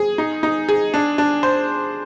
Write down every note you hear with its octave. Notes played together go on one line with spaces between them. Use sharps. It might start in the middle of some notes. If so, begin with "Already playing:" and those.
Already playing: G#4
D#4
D#4
G#4
D4
D4
C5